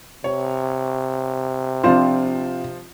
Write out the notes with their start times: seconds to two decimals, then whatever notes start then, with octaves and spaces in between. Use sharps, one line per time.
0.24 C3 C#5
1.84 F3 C4 D4 F4 C5